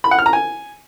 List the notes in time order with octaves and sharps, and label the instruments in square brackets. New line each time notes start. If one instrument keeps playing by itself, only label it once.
[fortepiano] B5
F#5
F6
A#5
G#5